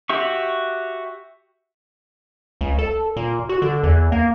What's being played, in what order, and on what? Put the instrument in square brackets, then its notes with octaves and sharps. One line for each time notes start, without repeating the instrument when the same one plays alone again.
[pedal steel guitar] F#4 G4 E5 C#6
[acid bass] C#2
A4
A#2
F#4
D3
E2
A#3